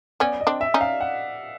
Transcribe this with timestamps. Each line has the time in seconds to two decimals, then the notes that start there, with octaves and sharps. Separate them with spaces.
0.20 B3 C#4 D5
0.41 D#5
0.47 C4 D4
0.61 E5
0.74 C#4 D#4
0.81 F5
1.01 F#5